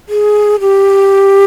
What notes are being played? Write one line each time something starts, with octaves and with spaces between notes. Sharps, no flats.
G#4
G4